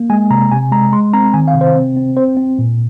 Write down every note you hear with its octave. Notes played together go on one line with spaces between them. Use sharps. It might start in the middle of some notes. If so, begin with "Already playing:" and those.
Already playing: A#3
G#3 G#5
C3 A#5
C3 G#5
G#3 A#5
G#3 C6
C4 A#5
D#3 G#5
F5
C3
C5
C4
C4
C4 C5
C4
A#2